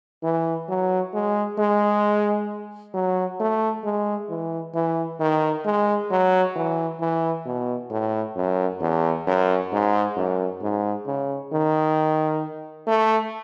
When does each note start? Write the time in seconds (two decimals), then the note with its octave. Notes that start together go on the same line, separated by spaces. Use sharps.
0.23 E3
0.69 F#3
1.14 G#3
1.58 G#3
2.94 F#3
3.40 A3
3.84 G#3
4.29 E3
4.74 E3
5.20 D#3
5.65 G#3
6.11 F#3
6.56 E3
7.01 E3
7.46 B2
7.91 A2
8.36 F#2
8.81 E2
9.27 F#2
9.72 G#2
10.16 F#2
10.62 G#2
11.07 C#3
11.52 D#3
12.87 A3